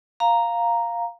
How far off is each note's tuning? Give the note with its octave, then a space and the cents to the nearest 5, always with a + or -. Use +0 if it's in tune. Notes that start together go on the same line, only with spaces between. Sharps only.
F5 +0 A#5 +0